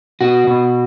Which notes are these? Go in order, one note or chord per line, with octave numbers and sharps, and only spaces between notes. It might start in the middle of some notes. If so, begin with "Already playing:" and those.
B2 F#4
B2